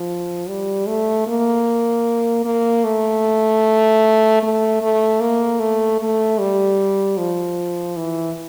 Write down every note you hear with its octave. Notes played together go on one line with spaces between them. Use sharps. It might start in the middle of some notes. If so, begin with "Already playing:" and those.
Already playing: F3
G3
A3
A#3
A#3
A3
A3
A3
A#3
A3
A3
G3
F3
E3